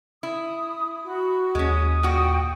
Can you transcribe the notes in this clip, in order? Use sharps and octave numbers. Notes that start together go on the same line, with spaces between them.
E4 D#6
F#4 B5
D#2 G#3 C#4 D#6
A#2 F#4 G5